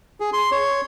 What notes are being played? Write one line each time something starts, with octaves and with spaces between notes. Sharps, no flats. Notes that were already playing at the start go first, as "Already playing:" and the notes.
G#4
C6
C#5